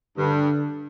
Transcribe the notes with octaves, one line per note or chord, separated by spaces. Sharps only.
G2 D3